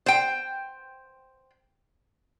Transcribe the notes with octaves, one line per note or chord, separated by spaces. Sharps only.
C5 G5